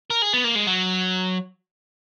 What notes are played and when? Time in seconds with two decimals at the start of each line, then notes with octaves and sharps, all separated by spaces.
0.10 A#4
0.22 G#4
0.33 B3
0.44 A#3
0.55 G#3
0.67 F#3